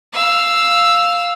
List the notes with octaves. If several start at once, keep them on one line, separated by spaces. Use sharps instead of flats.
F5 E6